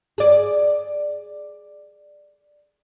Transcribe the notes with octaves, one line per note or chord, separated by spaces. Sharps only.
G#4 D5